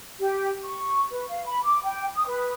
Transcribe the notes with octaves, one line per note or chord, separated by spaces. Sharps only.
G4
C#6
B4
F5
B5
D6
G5
D#6
B4